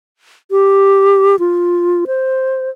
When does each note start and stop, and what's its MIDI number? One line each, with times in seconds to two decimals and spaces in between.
0.51 1.36 67
1.39 2.05 65
2.07 2.70 72